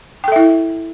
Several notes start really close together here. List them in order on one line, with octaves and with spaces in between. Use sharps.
G5 A4 E5 E4